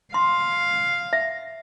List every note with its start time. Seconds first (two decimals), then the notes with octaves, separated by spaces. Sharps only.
0.14 F5 C6
1.13 E5